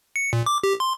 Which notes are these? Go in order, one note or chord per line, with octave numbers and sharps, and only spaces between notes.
C#7
A#2
D6
G4
C6